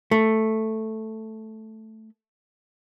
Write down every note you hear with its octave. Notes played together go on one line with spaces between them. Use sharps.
A3